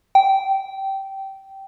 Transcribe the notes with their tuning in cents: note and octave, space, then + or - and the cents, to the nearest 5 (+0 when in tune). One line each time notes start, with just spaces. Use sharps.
G5 -15